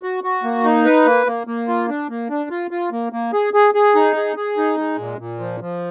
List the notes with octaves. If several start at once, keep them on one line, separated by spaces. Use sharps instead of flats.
F#4
F#4
A#3
D#4
B4
A#3
A#3
A#3
F4
D4
A#3
D4
F4
F4
A#3
A#3
G#4
G#4
G#4
D#4
G#4
G#4
D#4
G#3
A#2
A#2
F3
F3